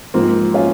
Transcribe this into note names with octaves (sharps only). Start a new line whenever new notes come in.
G#2 F3 A#3 C4
C#4 F4